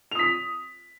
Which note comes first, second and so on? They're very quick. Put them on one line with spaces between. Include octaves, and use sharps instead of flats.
F7 D#6 B6